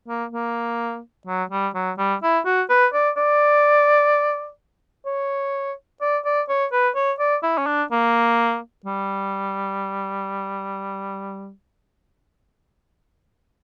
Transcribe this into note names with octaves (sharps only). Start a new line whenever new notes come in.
A#3
A#3
F#3
G3
F#3
G3
E4
F#4
B4
D5
D5
C#5
D5
D5
C#5
B4
C#5
D5
E4
C#4
D4
A#3
G3